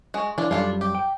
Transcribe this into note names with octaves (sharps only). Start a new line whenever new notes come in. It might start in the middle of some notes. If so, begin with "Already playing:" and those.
G#3 F#4
E3 D4 F4
F#2 G3 D4 F4 A4 F5
G4
G5